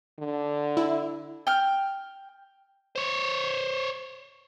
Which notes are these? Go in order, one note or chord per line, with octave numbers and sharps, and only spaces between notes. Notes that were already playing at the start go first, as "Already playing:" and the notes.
D3
E4
G5 F6
C5 C#5